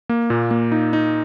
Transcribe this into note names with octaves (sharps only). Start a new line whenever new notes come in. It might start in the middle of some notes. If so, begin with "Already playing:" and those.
A#3
A#2
A#3
D#4
D#4